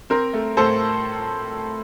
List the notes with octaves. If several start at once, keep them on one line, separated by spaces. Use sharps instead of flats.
C4 A#4
A3
A2 A4 C5